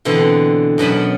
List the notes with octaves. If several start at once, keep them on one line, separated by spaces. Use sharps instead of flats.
B2 D3 E3 C4
F#2 B2 C#4 B5